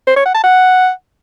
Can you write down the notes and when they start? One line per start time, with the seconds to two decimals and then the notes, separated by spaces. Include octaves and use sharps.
0.07 C5
0.16 C#5
0.26 F#5
0.35 A5
0.44 F#5